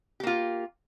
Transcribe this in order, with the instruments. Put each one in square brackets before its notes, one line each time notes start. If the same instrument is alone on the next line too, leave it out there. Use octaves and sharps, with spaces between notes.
[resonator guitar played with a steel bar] G4
A#3
F4